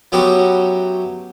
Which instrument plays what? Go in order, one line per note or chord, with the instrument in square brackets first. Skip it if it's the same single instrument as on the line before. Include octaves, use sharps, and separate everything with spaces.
[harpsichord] F#3 A3 B3 C#4 F#4 G4